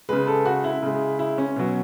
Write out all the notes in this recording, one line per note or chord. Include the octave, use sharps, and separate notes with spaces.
C#3 G#3 B4
A4
F#4
E4
C#3 G#3
E4
C#4
B2 F#3